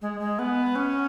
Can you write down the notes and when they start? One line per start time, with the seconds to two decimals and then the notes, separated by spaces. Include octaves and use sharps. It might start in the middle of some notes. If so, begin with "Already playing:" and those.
0.02 G#3
0.20 G#3
0.39 B3
0.75 C#4